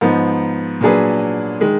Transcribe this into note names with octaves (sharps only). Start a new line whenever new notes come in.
G#2 F3 B3 D#4
A#2 F#3 D4 G#4 B4
D#3 G#3